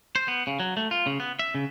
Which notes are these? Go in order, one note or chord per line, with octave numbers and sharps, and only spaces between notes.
C5
B3
C#3
F#3
A3
F4
C#3
B3
E5
C#3